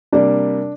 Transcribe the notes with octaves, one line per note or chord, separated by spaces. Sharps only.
C3 G3 A#3 D4